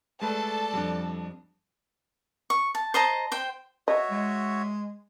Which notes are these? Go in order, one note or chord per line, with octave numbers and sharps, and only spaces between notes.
G#3 A3 A4 B4 D5 A5
F2 G3 D4
C#6
A5
C5 D#5 A5 A#5
C5 G5
F#4 C#5 D#5 E5
G#3